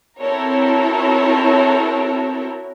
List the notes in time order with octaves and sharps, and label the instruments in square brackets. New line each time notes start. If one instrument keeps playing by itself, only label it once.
[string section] C4 E4 F#4 A4 A#4 C#5